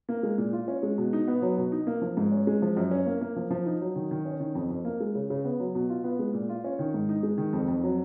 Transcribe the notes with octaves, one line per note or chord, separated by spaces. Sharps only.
A#3
G#3
A#2
F4
C#4
G#3
B2
D#4
B3
F#3
B2
D#4
A#3
F3
G#2
C#4
G#3
F3
F#2
C#4
A#3
A#3
F3
F3
D#4
F#3
D#3
D#3
C#4
D#3
F2
F2
A#3
G#3
C#3
C#3
B3
F#3
B2
F4
B3
G#3
A#2
F4
C#4
D#3
G#2
D#4
G#3
D#3
F2
F2
F#3